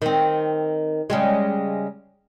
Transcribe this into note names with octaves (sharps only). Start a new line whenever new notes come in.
D#3 C4
C#3 G3 G#3